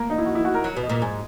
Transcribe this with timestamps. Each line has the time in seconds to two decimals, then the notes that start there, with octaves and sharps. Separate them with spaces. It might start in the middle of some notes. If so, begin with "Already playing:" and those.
Already playing: A#3 A#4
0.10 D#4
0.18 E4
0.25 F#4
0.35 E4
0.45 F#4
0.54 A#4
0.64 F#3
0.76 B2
0.83 D#5
0.89 A#2
1.02 G#2 G#5